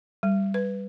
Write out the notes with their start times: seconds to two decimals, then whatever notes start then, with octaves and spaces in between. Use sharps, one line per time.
0.23 G3
0.54 B4